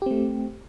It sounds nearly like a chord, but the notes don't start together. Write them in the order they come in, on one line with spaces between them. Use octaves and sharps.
G4 C4 A3